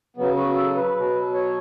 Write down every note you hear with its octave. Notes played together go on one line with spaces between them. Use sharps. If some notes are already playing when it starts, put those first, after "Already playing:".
C#3 F#3 B3
F#4
A4
B4
B2 F#3
C#5